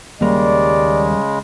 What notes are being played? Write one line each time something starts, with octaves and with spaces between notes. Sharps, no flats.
D#2 C#3 G3 G#3 A#3 D5